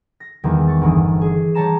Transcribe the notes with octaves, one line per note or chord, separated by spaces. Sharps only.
A#6
E2 D#3 G3 G#3
C#6 A6
G1 G2 E3 D#6
G#4
G3 C#5 A5 A#5 E7